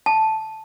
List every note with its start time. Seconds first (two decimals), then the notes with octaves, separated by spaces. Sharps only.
0.06 A5